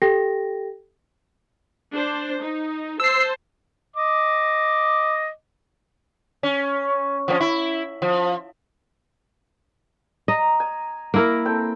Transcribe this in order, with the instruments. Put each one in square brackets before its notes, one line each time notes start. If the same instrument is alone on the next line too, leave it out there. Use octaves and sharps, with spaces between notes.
[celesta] G4 A4 G5 A#6
[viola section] D4 C5
D#4
[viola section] C5 A5 [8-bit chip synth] E6 C7
[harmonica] D#5 D6
[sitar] C#4
F3 A#3 C#4
E4
F3
[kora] D#5 [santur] A#5
[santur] G#5
[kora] A#3 E4 A#4
[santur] C4 A4 G5